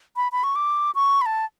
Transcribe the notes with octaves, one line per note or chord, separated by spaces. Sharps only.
B5
B5
C#6
D6
C#6
B5
A5